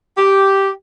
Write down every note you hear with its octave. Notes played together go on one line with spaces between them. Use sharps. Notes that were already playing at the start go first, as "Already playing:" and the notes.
G4